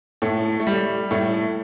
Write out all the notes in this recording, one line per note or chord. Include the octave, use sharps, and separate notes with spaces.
A2 A3
A3
G3
A2 A3